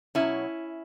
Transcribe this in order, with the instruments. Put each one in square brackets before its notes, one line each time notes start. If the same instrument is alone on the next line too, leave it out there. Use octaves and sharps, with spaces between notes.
[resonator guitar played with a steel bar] B2 F#3 C#4 E4